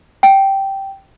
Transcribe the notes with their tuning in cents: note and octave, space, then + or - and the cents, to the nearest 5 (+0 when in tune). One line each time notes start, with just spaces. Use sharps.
G5 -10